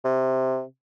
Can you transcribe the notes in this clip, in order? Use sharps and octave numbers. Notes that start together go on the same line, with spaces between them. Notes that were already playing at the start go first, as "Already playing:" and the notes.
C3